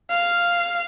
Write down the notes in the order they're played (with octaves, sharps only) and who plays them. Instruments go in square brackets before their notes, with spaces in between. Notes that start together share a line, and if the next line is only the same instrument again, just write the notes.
[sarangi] F5